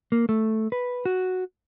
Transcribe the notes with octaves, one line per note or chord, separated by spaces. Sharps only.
A#3
A3
B4
F#4